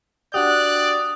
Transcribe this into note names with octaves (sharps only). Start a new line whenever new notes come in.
D4 F#4 G4 D5 D#6 F#6